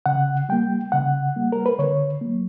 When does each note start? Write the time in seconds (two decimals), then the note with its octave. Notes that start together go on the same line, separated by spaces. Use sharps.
0.06 C#3 F#5
0.49 G3 A#3 G5
0.92 C#3 F#5
1.36 G3 A#3
1.52 A#4
1.66 B4
1.79 D3 C#5
2.21 F#3 A#3